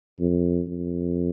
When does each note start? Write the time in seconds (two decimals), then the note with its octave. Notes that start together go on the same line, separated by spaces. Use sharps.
0.20 F2
0.68 F2